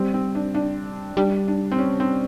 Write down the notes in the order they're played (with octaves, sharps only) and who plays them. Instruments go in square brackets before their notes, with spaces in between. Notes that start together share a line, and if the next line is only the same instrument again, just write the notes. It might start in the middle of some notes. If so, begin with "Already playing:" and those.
Already playing: [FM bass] G3 [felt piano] C4
[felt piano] C4
D4
D4
[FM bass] G3 [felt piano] D4
[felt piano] D4
C4
C#4
C4